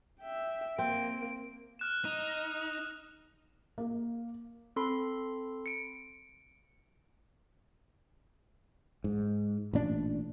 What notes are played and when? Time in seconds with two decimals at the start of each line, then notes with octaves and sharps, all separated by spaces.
0.20 E5 G5
0.78 A#3 C4 D7
1.79 F6 F#6 E7
2.05 D#4
3.78 A#3
4.76 C4 A4 B5 C6
5.66 C#7 D7
9.04 G#2
9.73 A1 A#2 D4